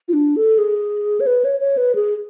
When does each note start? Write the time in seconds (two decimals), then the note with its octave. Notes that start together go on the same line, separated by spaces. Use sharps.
0.08 F4
0.13 D4
0.36 A4
0.58 G#4
1.20 C#5
1.27 B4
1.45 C#5
1.60 C#5
1.77 B4
1.95 G#4